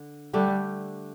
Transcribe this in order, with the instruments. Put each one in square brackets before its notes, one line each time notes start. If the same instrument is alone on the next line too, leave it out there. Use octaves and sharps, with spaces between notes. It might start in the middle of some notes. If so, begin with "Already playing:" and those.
Already playing: [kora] D3
[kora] D3 A3 D4 G4 [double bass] G3